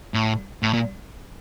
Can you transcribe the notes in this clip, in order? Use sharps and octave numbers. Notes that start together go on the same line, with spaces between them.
A2
A2
A#2